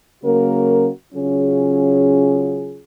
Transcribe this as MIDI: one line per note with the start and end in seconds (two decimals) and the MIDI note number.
0.24 0.89 49
0.24 0.89 54
0.24 0.89 58
0.24 0.89 61
0.24 0.89 66
0.24 0.89 70
1.15 2.81 49
1.15 2.81 54
1.15 2.81 61
1.15 2.81 65
1.15 2.81 68